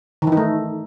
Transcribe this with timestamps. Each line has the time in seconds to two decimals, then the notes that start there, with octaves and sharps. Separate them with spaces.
0.22 D#3
0.27 E3
0.32 D#4
0.37 A3